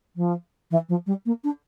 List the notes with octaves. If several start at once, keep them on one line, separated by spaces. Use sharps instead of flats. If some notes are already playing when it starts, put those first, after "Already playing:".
F3
E3
F3
G3
A#3
D4